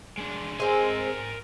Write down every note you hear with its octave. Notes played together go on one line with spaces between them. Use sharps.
G#3 D4
G#3 C4 A#4 G#5